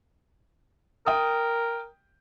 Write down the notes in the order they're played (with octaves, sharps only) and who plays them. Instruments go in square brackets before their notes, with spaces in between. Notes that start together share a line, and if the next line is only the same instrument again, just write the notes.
[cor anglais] A#4 [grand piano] G5 D#6